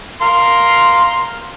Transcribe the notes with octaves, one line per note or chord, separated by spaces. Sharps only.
A#4 F5 C6